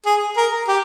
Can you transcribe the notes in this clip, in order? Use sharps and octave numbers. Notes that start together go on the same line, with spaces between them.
G#4
A#4
G4